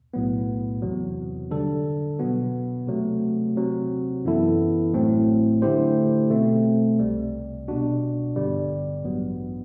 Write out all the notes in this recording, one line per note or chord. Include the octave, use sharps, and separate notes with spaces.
B1 A2 F#3 B3
E2 C3 F#3
D3 G3 D4 A4
B2 F#3 B3 F#4
C3 F#3 A3
C3 F#3 C4
F#2 E3 B3 E4 A4
A1 A2 F#3 C4
D3 A3 E4 G4 C5
B2 A3 C4
C2 C3 G3
B2 G3 D4 F#4
A1 G2 D3 G3 B3
A1 G2 F#3 B3